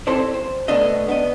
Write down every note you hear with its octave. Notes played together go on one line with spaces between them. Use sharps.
C4 E4 G4 A4 C5 D5
C5
B1 A3 B3 D4 D#5
B3 D4 D#5